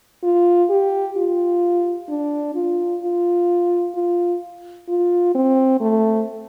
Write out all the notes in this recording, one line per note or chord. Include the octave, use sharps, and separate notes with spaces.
F4
G4
F4
D4
F4
F4
F4
F4
C4
A3